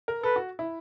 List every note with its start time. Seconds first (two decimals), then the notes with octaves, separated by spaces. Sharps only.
0.08 A#4
0.23 A4 B4
0.36 F#4
0.59 E4